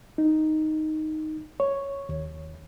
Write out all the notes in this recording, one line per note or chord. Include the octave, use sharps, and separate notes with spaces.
D#4
C#5
D#2